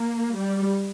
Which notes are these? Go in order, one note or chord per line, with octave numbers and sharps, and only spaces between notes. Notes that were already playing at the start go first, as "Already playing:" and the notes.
Already playing: A#3
G3